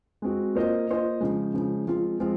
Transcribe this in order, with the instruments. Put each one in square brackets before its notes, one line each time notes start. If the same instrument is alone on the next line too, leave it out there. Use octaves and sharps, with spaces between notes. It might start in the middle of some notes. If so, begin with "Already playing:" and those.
[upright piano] G#3 C4 F#4
A#3 F4 C5 D#5
A#3 F4 C5 D#5
C#3 F3 G#3
C#3 F3 G#3
F3 G#3 C4 F4
F3 G#3 C4 F4